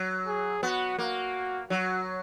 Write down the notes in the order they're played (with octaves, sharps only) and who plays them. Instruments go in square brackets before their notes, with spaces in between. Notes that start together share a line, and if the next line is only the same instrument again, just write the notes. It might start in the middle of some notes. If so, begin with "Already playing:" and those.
Already playing: [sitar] F#3
[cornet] G#4
[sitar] B3 [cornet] F#4
[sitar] A#3 [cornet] F#4
[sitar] F#3 [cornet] F#4